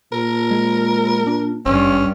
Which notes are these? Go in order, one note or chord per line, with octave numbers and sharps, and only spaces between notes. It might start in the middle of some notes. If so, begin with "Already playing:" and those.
A#2 A#4
G#3
D4
G#1 G2 C#4